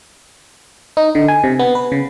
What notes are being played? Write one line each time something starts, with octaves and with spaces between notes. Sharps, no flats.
D#4
D3
G#5
C3
B3
B4
C#3